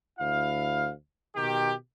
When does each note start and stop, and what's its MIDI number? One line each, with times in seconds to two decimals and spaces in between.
0.19 0.91 38
0.19 0.91 64
0.19 0.91 77
1.36 1.74 47
1.36 1.74 51
1.36 1.74 67